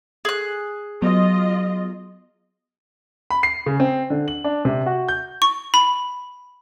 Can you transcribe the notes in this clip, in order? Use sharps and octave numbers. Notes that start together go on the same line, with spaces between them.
G#4 F#6
F#3 B3 F4 D#5
B5
C7
C#3
C4
D3
F#7
D4
C3
F#4
G6
C#6
B5